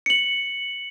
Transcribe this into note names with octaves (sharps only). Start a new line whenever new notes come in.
C#7 F#7